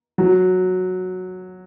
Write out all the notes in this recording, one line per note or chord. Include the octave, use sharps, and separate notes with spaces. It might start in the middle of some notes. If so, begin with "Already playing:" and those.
F#3